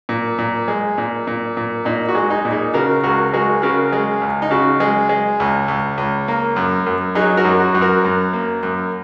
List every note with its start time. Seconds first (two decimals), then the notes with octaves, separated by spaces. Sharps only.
0.09 A#2
0.38 A#2
0.68 G#3
0.98 A#2
1.27 A#2
1.57 A#2
1.85 A#2 D#4
2.09 F#4
2.15 G#3
2.30 D#4 G#4
2.45 A#2
2.52 D#4 G#4
2.74 C#3 F#4 A#4
3.04 C#2 F#4 A#4
3.33 G#3 F#4 A#4
3.62 C#3 F#4 A#4
3.92 G#3
4.22 C#2
4.42 D#4
4.51 C#3 F#4
4.80 G#3
5.09 G#3
5.40 C#2
5.68 C#2
5.98 C#2
6.28 A#3
6.56 F#2
6.86 F#2
7.15 F#3 D#4 G#4
7.37 F#4 A#4
7.45 F#2
7.60 F#4
7.75 F#2
7.82 F#4 A#4
8.05 F#2
8.33 A#3
8.63 F#2